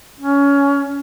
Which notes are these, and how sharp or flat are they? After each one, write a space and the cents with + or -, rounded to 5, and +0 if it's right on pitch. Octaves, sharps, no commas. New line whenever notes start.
C#4 +20